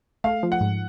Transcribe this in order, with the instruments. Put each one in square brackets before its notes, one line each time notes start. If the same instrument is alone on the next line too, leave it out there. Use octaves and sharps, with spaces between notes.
[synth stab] A3 [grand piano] F5
[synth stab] F3
[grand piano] F#5
[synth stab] G#2